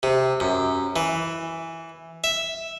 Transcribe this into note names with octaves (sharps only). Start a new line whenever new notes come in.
C3
F#2
E3
E5